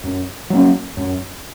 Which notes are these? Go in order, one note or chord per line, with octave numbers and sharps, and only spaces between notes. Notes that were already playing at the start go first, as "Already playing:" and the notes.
F#2
F#3 A#3 C#4
F#2